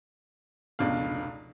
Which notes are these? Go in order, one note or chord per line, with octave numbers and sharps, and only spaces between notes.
F1 C#2 B2 D4 F5